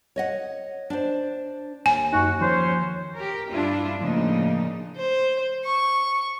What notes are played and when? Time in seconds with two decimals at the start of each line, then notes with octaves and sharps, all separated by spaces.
0.16 C#5 D#5 F#5
0.90 D4 C5
1.86 D#2 G#5
2.13 F#2 D#4 F#4
2.41 D#3 F3 C#4 C5
3.16 G4 A#4
3.52 G2 D4 E4 F4
3.98 A2 C#3 F3 A#3 D4 D#4
4.96 C5
5.65 C#6